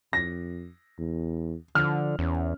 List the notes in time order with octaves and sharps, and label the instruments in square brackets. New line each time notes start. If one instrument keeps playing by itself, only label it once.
[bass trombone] F2 [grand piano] A#6
[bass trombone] E2
[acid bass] D3 [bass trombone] F3 [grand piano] F6
[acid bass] E2 [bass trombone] C#4